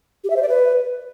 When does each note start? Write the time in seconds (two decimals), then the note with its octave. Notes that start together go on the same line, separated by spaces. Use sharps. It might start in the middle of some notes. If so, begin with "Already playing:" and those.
0.24 G4
0.30 E5
0.36 C5
0.42 D5
0.49 B4